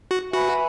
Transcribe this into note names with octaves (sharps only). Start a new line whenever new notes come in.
F#4
F#4 B4 E5 G#5 B5